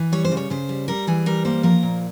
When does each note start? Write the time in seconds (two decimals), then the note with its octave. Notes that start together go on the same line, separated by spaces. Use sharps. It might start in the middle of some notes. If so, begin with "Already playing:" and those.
Already playing: E3
0.12 G3 C#5
0.25 C5
0.31 C#3
0.37 C#5
0.50 C#3 C5
0.69 G3
0.88 G3 A#4
1.07 E3 G#4
1.26 G3 A#4
1.45 A#3 C5
1.63 F3 A#4
1.83 A#2